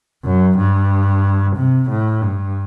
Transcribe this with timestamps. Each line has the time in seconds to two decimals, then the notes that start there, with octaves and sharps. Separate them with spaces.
0.24 F#2
0.58 G2
1.56 C3
1.89 A2
2.22 G2